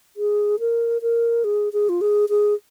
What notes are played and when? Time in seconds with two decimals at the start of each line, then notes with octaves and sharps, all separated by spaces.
0.17 G#4
0.60 A#4
1.02 A#4
1.44 G#4
1.73 G#4
1.89 F4
2.01 G#4
2.29 G#4